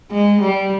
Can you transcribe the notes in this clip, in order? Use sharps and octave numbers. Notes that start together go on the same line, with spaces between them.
G#3
G3